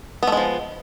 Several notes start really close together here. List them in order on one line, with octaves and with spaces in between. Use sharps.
B3 A3 G#3 F3